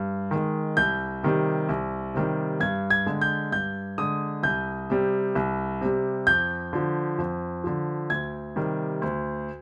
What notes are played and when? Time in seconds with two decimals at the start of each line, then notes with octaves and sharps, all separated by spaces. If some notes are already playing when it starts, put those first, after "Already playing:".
Already playing: G2
0.31 D#3 G#3
0.77 C2 G6
1.23 C3 D#3 G3
1.69 C2
2.14 C3 D#3 G3
2.60 G2 G#6
2.90 G#6
3.06 D3 G#3
3.21 G6
3.52 G2 G6
3.98 D3 G#3 D#6
4.43 C2 G6
4.90 C3 G3
5.35 C2
5.81 C3 G3
6.27 F2 G6
6.73 D3 F3
7.18 F2
7.64 D3 F3
8.10 D2 G#6
8.56 C3 D#3 G3
9.02 D2